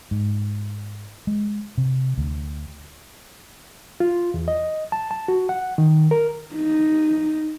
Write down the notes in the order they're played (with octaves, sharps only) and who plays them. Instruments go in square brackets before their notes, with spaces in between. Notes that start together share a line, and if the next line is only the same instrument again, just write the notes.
[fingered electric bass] G#2
G#3
C3
D2
[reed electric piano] F4
E2
D#5
A5
A5
F#4
F#5
D#3
A#4
[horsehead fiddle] D#4